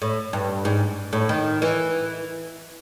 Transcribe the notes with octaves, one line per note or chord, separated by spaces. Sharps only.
A2
G2
G#2
A2
D#3
E3